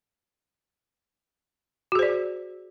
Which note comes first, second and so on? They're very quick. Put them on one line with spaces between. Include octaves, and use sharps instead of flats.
F#4 G#4 C5 D5